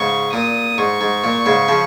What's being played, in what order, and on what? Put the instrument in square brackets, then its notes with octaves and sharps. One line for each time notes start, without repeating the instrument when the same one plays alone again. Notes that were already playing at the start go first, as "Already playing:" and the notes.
Already playing: [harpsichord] G#2 C#3 [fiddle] C#6
[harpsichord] A#2 [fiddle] D#6
[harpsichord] G#2 [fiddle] C#6
[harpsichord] G#2
A#2
G#2 C#3
C#3 F3